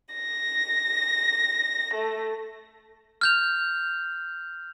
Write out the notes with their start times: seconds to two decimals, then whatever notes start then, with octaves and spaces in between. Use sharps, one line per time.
0.15 A#6
1.93 A3
3.21 F6 G6 F7